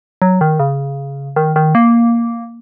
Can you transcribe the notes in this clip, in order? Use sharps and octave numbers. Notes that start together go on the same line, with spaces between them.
F#3
D#3
C#3
D#3
D#3
A#3